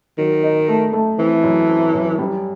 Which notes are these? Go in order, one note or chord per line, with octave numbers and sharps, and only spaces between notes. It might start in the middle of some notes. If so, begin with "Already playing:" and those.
D#3 F#3
D#4
A3
A3
E3 C4
F#2
C4
F#2
G3